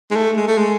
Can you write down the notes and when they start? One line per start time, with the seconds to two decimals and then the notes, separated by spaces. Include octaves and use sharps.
0.11 G#3
0.16 A3
0.37 G#3
0.48 A3
0.58 G#3